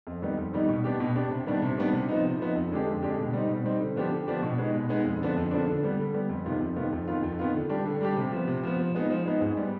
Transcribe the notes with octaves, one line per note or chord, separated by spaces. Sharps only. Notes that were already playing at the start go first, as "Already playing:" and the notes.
F2
D#3 G3 B3 D#4
F2
D#3 G3 B3 D#4
B2
B3 D4 G4
B2
B3 D4 G4
C3
D#3 G3 B3 D4
C3
D#3 G3 B3 D4
C3
F3 B3 D#4
C3
F3 B3 D#4
F2
D3 G#3 D4 G4
F2
D3 G#3 D4 G4
B2
G3 C4 D#4
B2
G3 C4 D#4
D3
F3 B3 D4 G4
D3
F3 B3 D4 G4
B2
G#3 B3 D#4
B2
G#3 B3 D#4
F2
D3 F3 B3 D4
F2
D3 F3 B3 D4
D3
G3 B3
D3
G3 B3
F2
C3 D#3 B3 F4
F2
C3 D#3 B3 F4
F2
D#3 B3 F4
F2
D#3 B3 F4
D3
G3 D4 G4
D3
G3 D4 G4
C3
F3 B3
C3
F3 B3
F3
G#3 B3 D#4
F3
G#3 B3 D#4
G#2
G3 B3